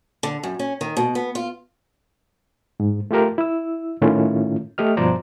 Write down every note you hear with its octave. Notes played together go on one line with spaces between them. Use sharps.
D3
F#2
C#4
D#3
B2
B3
F4
G#2
A3 F4 G4 A#4
E4 E6
A2 D#3 A3 C#4 E4 F4
A3 G4 D#5 F6
G2 B2 F3 C5 D5 A#5